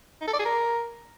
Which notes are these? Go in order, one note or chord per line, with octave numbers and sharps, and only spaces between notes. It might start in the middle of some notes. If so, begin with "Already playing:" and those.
D#4
A4
D5
G#4
A#4